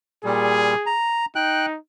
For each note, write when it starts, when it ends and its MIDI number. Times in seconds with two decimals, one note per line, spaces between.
0.25 0.75 46
0.25 0.75 55
0.25 0.97 68
0.86 1.26 82
1.36 1.77 63
1.36 1.66 79
1.36 1.66 90